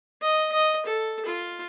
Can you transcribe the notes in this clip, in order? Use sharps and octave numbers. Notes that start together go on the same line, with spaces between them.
D#5
D#5
A4
F4